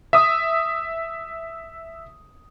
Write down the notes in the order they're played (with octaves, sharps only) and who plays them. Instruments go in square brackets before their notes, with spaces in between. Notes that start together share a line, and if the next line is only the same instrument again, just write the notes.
[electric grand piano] E5 D#6